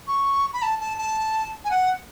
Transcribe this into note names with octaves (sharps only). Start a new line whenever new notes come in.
C#6
B5
A5
A5
A5
G#5
F#5